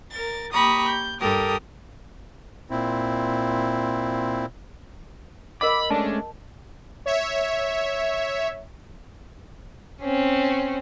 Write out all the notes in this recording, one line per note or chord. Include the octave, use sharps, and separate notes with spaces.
A#4 A6
A#3 G4 A#5 B5 C#6 D#6
G6
G2 G4 A4 A#4 D#6
A#2 C4 E4
A#4 D#5 F#5 B5 D6
G#3 A3 C#4 D4 A5
C#5 E5
C4 C#4